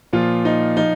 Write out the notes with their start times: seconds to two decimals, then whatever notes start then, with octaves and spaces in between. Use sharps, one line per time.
0.13 A#2 F3 F4
0.45 D#4
0.76 F3 D#4